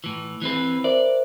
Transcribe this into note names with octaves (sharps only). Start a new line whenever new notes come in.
A2 E3
E3 C4 B4
A#4 C5 D5 E5